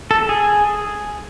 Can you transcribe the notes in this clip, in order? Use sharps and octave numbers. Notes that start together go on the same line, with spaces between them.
A4
G#4